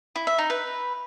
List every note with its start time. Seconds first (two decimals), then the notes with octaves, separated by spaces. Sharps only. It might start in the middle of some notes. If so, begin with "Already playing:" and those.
0.16 E4
0.27 E5
0.38 D#4
0.50 B4